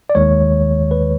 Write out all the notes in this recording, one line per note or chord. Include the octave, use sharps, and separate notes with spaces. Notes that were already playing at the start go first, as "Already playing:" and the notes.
D5
D#2 D#3 G#3 C#5
B4